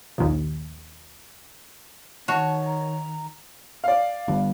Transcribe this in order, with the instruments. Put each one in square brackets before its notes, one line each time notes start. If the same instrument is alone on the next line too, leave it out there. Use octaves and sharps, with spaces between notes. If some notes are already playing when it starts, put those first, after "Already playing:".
[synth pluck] A#1 D#2
[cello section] D#3 [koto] F#4 [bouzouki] C#5 [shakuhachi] A5
[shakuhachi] A#5
[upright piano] D5 F5
[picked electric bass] G1 G2